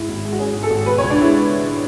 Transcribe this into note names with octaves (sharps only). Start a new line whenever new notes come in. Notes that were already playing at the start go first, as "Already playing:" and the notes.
Already playing: G#2 E4
G#1
G#3
F#4
C#4 G#4
G#2
A4
G#1
B2 B4
C#5
C#2
D4
G#3 E4